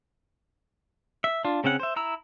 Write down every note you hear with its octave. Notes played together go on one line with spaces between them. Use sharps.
E5
D4 F4
C#3 C4 C#4 F#5
C5 E5
E4 A#5 E6